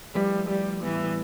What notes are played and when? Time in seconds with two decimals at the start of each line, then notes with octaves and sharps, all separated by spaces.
0.15 F3 G3 A3 E4 B4
0.49 G3
0.83 A2 E3 G3 B3